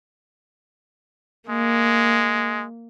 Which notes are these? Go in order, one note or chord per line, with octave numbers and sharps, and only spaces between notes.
G#3 A#3